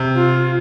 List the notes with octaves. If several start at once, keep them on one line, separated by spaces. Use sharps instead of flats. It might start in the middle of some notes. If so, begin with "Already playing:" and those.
Already playing: C3
F4